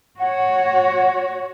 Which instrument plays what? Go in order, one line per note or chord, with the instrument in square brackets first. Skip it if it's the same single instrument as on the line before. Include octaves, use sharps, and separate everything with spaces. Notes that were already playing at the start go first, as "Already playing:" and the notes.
[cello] F#4 C#5 [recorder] F#5